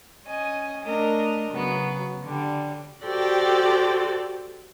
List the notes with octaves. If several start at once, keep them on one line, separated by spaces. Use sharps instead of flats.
C#4 D#5 G#5
A3 D4 A#4 D#5
C#3 F#3 B3
D3 G3
F#4 G4 A4 C5 D5 G5